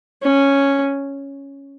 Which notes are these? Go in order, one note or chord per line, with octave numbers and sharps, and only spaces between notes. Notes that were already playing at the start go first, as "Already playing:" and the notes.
C#4